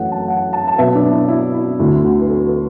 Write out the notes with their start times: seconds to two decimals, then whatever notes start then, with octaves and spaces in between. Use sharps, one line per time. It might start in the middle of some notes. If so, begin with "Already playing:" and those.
Already playing: F#2 E3 A3 F#5
0.11 A5
0.28 F#5
0.53 A5
0.68 A5
0.78 B2 F#3 B3 E5
0.95 D4
1.12 E4
1.28 E4
1.54 E4
1.79 D2 D3 A3 E4
2.04 F#4
2.20 B4
2.29 A4
2.46 B4